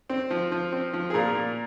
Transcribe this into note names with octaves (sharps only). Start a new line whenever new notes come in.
C4
F3
F3
C4
F3
G#4
A#2 A#4
A#2